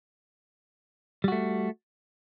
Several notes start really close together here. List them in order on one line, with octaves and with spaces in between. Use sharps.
G3 F#4 A3